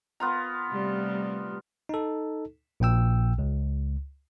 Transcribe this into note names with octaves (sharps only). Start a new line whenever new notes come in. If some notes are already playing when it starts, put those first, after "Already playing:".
B3 F4 A#5
C3 G3 A3
D#4 A4
A#1 A#2 G5 E6
C#2